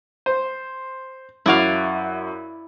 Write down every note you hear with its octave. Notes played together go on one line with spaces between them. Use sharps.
C5
F#2 E4 F#4 D5 F5